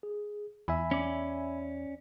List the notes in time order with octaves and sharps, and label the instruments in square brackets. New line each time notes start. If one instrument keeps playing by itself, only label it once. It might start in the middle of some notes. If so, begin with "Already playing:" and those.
[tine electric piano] G#4
[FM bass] E2 [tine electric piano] E5 G#5 B5
[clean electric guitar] C#4 D5